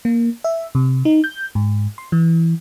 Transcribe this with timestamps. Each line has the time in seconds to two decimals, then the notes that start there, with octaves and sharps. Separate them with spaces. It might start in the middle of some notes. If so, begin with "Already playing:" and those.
0.05 A#3
0.44 E5
0.75 C3
1.05 D#4
1.24 G6
1.55 G#2
1.98 C6
2.12 E3